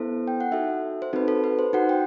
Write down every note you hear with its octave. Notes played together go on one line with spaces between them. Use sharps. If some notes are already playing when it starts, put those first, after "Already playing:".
Already playing: B3 E4 A4 C5
G5
F#5
D#4 F#4 A4 E5
C5
C4 D#4 F#4 A4 B4
A4
B4
C5
D#4 F#4 A4 F#5
G5